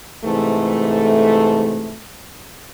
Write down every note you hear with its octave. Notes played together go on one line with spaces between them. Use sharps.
G#2 C3 E3 A3